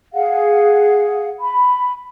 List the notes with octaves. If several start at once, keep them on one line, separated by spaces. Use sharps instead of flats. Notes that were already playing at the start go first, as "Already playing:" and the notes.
G#4 F5 F#5
B5